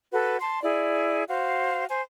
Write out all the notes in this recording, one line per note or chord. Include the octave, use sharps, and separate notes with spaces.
F#4 A4 B4
A5 C6
E4 G#4 D5
F#4 C5 F5
C5 G#5